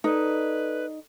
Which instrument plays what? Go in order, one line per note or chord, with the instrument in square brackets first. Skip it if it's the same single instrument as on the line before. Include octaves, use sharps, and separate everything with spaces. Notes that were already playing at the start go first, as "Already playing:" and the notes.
[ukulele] D#4 [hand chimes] A4 D5 [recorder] B4